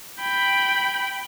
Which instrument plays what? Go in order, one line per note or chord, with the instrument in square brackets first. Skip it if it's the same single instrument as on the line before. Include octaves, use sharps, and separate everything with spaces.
[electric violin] G5 B5